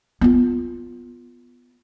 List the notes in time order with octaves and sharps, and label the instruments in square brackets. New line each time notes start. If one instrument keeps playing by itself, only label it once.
[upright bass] B3 F4